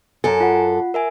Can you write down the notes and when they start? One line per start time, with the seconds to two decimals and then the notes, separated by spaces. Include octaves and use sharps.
0.24 F#2 A4 G#5 A#5
0.40 F4 F#5
0.94 A#4 E5 G#5